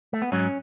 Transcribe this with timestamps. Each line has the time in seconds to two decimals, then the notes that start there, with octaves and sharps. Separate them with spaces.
0.13 A3
0.22 B3
0.32 G#2 F#3 C#4